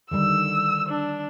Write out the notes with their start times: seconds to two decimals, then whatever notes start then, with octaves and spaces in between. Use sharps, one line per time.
0.11 D3 D#3 G3 E6
0.89 D4